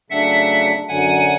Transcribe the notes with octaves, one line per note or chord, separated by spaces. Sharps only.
C#3 F#3 A3 D4 E5 F#5
F#2 D3 F#3 F#5 G#5